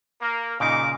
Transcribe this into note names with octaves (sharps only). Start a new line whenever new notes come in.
A#3 A#4
A#2 C#3 D#4 A#4 C#6 D6